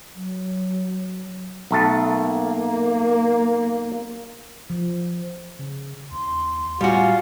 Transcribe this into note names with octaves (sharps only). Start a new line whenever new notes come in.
F#3
B1 A3 A5
A#3
F3
C#3
D#2 C6
A2 G3 F4 F#4 G#5